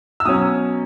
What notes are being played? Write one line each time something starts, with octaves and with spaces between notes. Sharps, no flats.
E6
B2 F#3 C#4 D#6